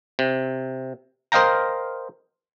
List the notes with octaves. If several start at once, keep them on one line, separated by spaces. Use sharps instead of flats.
C3
A#4 C5 D#5 F5 G5 A#5